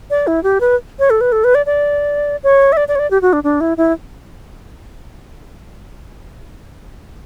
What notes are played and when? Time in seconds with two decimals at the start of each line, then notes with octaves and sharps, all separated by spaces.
0.10 D5
0.27 E4
0.43 G4
0.61 B4
0.99 C#5
1.10 A4
1.21 B4
1.32 A4
1.44 B4
1.55 D5
1.66 D5
2.44 C#5
2.72 E5
2.77 D5
2.88 D5
2.95 C#5
2.99 D5
3.11 G4
3.22 F#4
3.33 D4
3.44 D4
3.61 E4
3.77 E4